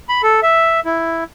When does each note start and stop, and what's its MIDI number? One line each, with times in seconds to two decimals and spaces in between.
0.09 0.22 83
0.23 0.40 69
0.43 0.80 76
0.85 1.24 64